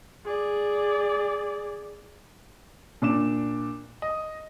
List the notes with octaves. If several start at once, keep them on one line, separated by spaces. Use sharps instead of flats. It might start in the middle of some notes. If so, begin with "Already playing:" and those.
G#4 D5
A#2 D4 D6 E7
D#5